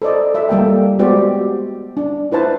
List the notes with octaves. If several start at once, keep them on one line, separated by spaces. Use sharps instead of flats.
A4 C5 D5 D#5
A4 E5
G3 A#3 A4 G5
G#3 B3 F#4 G4 C5 D5
D4
E4 B4 C5 A5